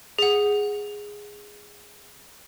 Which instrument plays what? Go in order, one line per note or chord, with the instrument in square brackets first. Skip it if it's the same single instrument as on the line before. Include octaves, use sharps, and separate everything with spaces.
[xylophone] G#4 F#5